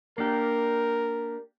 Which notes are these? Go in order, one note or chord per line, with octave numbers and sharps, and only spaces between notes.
A#3 D4 G4 A#4